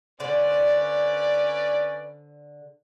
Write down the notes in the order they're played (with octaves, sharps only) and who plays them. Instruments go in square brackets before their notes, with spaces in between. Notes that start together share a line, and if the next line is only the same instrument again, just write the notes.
[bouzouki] D3 C5 [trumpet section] C#4 B4 D5